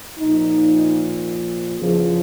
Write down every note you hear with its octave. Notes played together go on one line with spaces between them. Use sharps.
A#2 F3 D#4
E2 C#3 F3